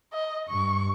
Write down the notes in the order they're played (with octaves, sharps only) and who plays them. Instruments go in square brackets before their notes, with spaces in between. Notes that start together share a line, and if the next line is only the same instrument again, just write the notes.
[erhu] D#5
[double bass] G2 [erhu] C#6